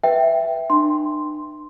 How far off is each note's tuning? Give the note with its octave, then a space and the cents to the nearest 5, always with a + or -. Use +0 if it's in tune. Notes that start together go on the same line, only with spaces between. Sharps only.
B4 +0 E5 +0 G5 +0
D4 +45 C6 +0